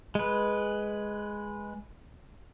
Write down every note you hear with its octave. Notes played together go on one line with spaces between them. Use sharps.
G#3 B4